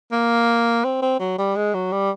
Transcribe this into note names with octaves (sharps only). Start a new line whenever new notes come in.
A#3
C4
C4
F#3
G3
G#3
F#3
G3